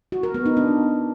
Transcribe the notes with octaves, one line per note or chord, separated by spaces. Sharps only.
F#4
A#4
B3
D#4
D4